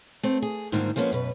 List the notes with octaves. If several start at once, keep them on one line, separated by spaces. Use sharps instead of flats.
A3 C4
G#4
G#2 D3 D#3 F3 G3 A#3
F3 G#3 A#3 B3 C#4
F#2 B2 B4